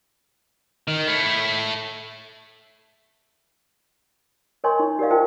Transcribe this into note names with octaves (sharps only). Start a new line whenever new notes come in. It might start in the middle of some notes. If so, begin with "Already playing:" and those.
D#3
A3 E4
A#4 C#5 D#5 G#5 C6 C#6
D#4
G4 A#4 D5 D#5 F5
F4 A#4 C5 E5 G5 A5